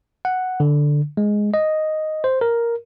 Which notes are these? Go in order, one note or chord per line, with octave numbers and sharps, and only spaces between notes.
F#5
D3
G#3
D#5
C5
A#4